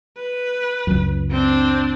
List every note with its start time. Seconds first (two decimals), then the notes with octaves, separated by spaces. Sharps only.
0.17 B4
0.87 C#2 F#2
1.31 C4 D4